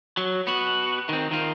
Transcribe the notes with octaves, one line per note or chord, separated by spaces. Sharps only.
F#3
B3 F#4
D#3 C4
D#3 F4